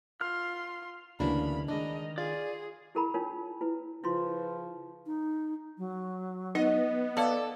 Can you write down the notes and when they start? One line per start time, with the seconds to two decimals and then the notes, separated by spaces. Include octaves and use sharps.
0.21 F4 C6 F6
1.20 D2 C#3 E3 F#3 A#3 D4 B5
1.68 D#3 G#3 D4 D#5
2.18 F4 G#4 D5
2.95 E4 G#4 A#4 A#5 B5
3.14 D4 D#4 F4 A#4 C#5
3.61 E4 B4
4.04 C#3 F3 E4 F4 B4 C6
5.06 D#4
5.78 F#3
6.55 B3 D#4 D#5
7.17 A4 B4 D5 F5 A5